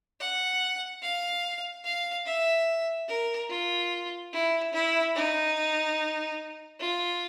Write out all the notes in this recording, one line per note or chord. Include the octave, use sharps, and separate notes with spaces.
F#5
F5
F5
E5
A#4
F4
E4
E4
D#4
F4